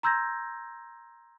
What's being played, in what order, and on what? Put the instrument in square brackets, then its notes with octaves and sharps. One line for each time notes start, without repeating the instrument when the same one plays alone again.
[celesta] A#5 C6 E6 G6 G#6 A#6